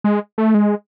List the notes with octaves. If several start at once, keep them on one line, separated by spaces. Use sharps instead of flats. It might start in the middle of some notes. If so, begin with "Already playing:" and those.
G#3
A3
G#3